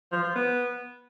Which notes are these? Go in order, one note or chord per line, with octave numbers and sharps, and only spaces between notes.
F3
F3
B3